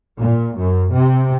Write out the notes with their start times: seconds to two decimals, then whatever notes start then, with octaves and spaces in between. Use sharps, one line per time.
0.20 A#2
0.57 F#2
0.93 C3